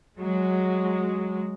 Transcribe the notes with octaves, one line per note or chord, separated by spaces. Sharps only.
F#3 G#3